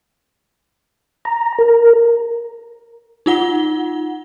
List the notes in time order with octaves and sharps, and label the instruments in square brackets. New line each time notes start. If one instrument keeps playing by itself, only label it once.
[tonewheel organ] A#5
A#4
[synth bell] D#4 F4 F#5 G7